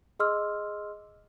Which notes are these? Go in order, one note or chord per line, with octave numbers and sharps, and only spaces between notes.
G#4 D#5 C6 D6 E6 F6